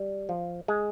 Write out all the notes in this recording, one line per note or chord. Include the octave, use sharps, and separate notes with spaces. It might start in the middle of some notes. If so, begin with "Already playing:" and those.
Already playing: G3
F3
G#3